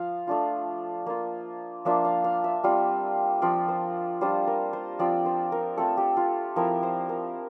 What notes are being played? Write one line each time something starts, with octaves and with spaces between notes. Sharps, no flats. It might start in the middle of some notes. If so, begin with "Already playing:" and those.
Already playing: F3 F4 F5
A3 D4 F4
A#3 F4
F3 A#3 D4 F4 E5
F5
F5
E5
G3 C4 F4
F3 C4 F4 D5
C5
G3 D4 F4 C5
A#4
C5
F3 C4 F4 D5
C5
A#4
A3 C4 F4 A4
G4
F4
F3 C4 E4 A#4
C5
A#4